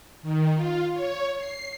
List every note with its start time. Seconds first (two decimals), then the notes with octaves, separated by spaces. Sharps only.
0.22 D#3
0.55 F4
0.93 C#5
1.38 C7